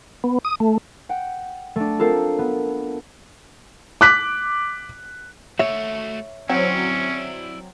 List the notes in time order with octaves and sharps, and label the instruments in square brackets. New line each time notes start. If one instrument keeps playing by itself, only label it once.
[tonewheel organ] B3
D#6
A3
[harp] F#5 G5
A3 D4
C4 F4 A4 A#4
B3
[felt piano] D6 F#6 B6
[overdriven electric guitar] A3 F#4 [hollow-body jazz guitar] C#5 E5
[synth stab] F#3 C4 [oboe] C#4 [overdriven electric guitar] E4 D5